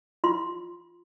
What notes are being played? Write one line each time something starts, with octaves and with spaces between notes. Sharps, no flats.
F4 C6